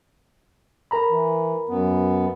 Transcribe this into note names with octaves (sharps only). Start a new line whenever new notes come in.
A#4 A#5 B5
E3
F#2 B3